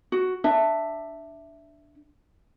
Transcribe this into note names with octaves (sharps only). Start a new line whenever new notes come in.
F#4
D4 E5